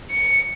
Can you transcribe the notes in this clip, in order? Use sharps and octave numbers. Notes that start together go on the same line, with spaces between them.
C#7